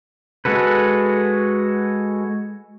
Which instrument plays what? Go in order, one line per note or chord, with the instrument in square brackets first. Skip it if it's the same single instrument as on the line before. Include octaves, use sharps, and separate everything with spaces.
[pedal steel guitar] G#3 F#4 A4 B4